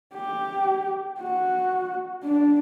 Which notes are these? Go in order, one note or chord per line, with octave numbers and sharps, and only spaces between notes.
G4
F#4
D4